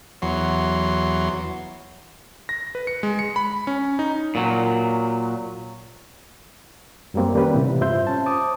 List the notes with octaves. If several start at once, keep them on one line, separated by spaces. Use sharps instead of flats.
E2 F#3 C6
A#6
B4
C#7
G#3
C#7
B5
C#4
D#4
A#2 F#3
F#2 F#3 G3 A#3 C4
D#3 G3 A#3 C#4 G4 B4
A2 C3 E3 C4
G2 F4 C5 E5 C6 G6
C#4 A5
C5 A5 D6 D#6